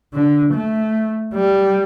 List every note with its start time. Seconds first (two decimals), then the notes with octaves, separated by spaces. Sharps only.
0.14 D3
0.53 A3
1.34 G3